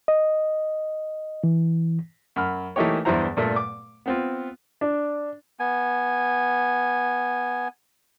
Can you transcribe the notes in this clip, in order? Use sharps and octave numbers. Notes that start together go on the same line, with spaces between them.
D#5
E3
F#2 B5 F6
E3 A3 A#3 D#4 G4 C#5
E2 G2 E3 E4 C5 A#5
G2 A#2 A3
D6
B3 C4 F4
D4
B3 G#5